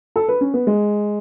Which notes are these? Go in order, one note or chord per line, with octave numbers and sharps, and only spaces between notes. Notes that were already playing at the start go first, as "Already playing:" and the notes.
A4
B4
C#4
B3
G#3